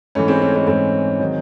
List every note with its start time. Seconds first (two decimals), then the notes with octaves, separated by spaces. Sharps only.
0.15 G#2 E3 A3 C#4
0.28 G#3 C4
0.42 A3 C#4
0.54 G#3 C4
0.67 G#2 E3 G#3 C4
1.20 D#3 F#3